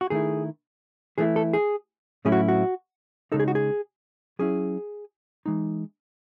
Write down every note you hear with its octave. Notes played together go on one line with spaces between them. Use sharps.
F#4
D#3 A3 E4 G#4
E3 A3 E4 G#4
A4
G#4
A2 F#3 A3 C#4 E4 G#4
F#4
F#4
C#3 G#3 D#4 A4
G#4
F#4
G#4
F#3 C#4 E4 G#4
E3 G#3 D#4